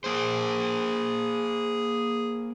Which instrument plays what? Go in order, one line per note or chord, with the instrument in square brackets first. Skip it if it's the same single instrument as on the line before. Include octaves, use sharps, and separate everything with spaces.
[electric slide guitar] A#3 C5 [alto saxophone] G#4